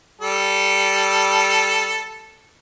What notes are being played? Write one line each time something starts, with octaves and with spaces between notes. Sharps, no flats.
G3 A4